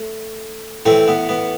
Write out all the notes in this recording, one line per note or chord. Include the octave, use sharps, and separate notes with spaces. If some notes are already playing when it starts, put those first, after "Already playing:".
Already playing: A3
A2 E3 A3 C4
B3
B3